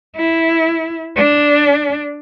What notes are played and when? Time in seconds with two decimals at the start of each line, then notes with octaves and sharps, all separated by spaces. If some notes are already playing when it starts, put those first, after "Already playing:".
0.16 E4
1.16 D4